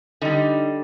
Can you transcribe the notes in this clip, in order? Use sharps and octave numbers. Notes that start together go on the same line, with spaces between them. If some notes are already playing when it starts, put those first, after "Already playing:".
D3 G3 D#4